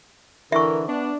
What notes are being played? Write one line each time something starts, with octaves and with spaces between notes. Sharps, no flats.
D3 E3 A#4 E5 C#6
B3 D4